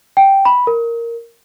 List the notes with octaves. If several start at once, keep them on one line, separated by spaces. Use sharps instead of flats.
G5
B5
A#4